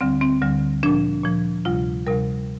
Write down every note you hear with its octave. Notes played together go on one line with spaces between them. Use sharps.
D2 D3 G3 C4
C4
D2 D3 G3
A#2 F3 D4
A#2 F3
D2 C3 G3 F4
D2 C3 G3 A#4